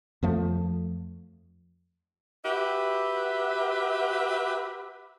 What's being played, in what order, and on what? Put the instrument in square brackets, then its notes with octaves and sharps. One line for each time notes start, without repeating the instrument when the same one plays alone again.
[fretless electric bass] F2 F3 A3
[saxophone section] F#4 G4 B4 E5